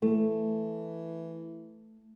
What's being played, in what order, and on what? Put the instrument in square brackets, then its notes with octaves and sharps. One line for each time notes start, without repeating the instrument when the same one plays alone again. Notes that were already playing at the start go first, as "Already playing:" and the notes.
[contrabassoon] E3 [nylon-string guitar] A3